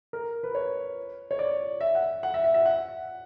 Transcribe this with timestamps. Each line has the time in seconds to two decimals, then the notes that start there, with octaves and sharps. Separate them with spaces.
0.13 A#4
0.43 B4
0.55 C#5
1.31 C#5
1.39 D5
1.81 E5
1.95 F#5
2.23 F#5
2.34 E5
2.44 E5
2.54 E5
2.66 F#5